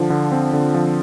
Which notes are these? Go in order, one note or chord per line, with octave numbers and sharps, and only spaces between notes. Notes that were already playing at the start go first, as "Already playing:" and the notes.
Already playing: D3 F3
D3
C4
D3
F3